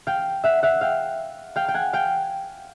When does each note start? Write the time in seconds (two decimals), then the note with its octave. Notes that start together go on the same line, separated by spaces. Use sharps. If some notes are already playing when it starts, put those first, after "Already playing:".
0.07 F5 G5
0.44 E5 F#5
0.63 E5 F#5
0.81 F5 G5
1.56 F5 G5
1.68 G5
1.74 F#5 G#5
1.93 F5 G5